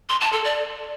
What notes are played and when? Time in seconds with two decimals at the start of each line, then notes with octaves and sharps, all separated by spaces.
0.09 C6
0.21 A5
0.32 A4
0.44 D5